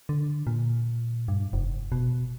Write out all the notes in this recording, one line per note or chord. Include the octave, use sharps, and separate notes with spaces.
D3
A#2
G2
F1
B2